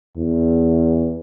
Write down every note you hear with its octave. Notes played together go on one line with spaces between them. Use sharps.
E2